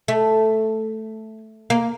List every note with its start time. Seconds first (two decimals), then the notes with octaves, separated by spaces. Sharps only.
0.08 A3
1.70 A#3